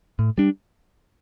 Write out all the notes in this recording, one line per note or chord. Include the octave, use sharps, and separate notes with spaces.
A2
G3 D4